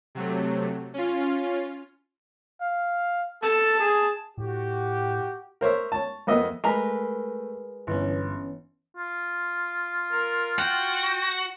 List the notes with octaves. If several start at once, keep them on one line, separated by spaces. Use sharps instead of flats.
C3 F#3 A3
C#4 F4
F5
A4 A5
G#4
A2 F#4 G4
A#4 C5 C#5 E5
C#5 A5
F2 A#3 B3 C5 D#5 E5
G#3 A3 A#4 B4 A#5
G1 E3 B3 C#4
F4
A#4
F#4 G5